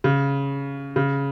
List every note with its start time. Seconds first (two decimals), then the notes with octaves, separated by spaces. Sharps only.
0.04 C#3
0.96 C#3